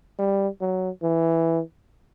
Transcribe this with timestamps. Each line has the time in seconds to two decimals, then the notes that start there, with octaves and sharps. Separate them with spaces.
0.19 G3
0.61 F#3
1.03 E3